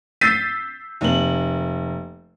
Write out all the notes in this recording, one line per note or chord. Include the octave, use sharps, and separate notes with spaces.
E6 G6 A6 B6 C7 D#7
F1 A#3 F#7